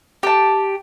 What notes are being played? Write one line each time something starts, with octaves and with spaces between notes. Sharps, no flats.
G4 A5